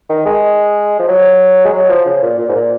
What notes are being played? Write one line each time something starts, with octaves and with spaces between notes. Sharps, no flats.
D#3
G#3
F3
F#3
G#3
F#3
F3
C#3
A#2
A#2
G#2
A#2